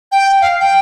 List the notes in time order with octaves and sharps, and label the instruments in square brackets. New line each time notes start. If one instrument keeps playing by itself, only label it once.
[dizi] G5
F5
G5